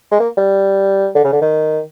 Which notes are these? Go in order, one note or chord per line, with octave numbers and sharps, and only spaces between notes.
G#3
A#3
G3
D3
C#3
D3
D#3